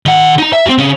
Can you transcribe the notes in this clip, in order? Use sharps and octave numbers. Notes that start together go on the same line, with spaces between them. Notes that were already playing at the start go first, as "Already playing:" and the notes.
D#3 F#5
D#4 A#5
E5
C4 F#4
C#3 C#4